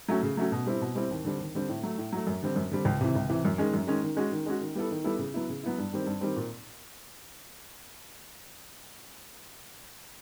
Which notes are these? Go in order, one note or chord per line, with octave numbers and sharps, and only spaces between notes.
F#3 A3 C#4 F#4
C#3
F#3 A3 C#4 F#4
B2
G3 C4 E4
B2
G3 C4 E4
D#2
D3 G3 C4
D#2
D3 G3 C4
A2
F#3 A3
A2
F#3 A3
F#2
D3 G3 C4
F#2
D3 G3 C4
C#2
C3 E3
C#2
C3 E3
F#2
D#3 G#3 C#4
F#2
D#3 G#3 C#4
D#3
G#3 C#4 F#4
D#3
G#3 C#4 F#4
D#3
G3 B3 E4 A4
D#3
G3 B3 E4 A4
C#3
F#3 B3 E4
C#3
F#3 B3 E4
G2
D#3 G3 C4
G2
D#3 G3 C4
A#2